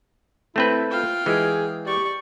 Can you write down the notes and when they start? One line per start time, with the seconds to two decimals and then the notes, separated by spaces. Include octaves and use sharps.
0.56 A3 C4 E4 B4
0.90 F4 F5 G5
1.26 E3 G#3 G#4
1.86 G4 D5 C#6